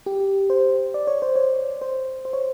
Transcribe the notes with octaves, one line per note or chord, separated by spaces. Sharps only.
G4
C5
D5
C#5
C5
C#5
C5
C5
C#5